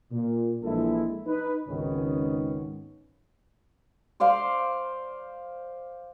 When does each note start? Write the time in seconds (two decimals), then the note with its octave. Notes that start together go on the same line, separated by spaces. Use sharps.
0.11 A#2
0.63 A#1 A#2 E3 G#3 E4 A4
1.27 D#4 B4
1.68 G#1 C#2 G#2 D#3 B3 C#4
4.20 C5 D5 F5 C6